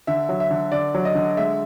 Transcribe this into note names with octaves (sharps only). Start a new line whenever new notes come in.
D3 E5
F#3
E5
D3
D3 D5
F#3
D#5
D3
G#3 E5